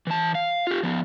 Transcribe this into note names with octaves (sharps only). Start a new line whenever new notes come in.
E3 A5
F5
F4 G4
F3 B3